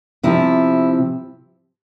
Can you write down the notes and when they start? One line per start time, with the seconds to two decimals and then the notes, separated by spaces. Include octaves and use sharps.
0.23 C3 F3 E4